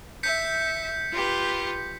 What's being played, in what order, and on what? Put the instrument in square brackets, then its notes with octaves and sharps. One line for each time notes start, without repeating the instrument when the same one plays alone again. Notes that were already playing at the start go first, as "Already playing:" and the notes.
[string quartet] E5 [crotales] G6 B6 C#7
[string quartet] F4 G4 B4